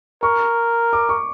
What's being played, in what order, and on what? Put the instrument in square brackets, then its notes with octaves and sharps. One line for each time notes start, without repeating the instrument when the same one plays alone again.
[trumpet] A#4 [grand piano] C#6
[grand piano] D6
C#6